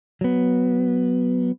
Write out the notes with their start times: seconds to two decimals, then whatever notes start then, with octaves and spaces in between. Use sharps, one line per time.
0.21 F#3 B3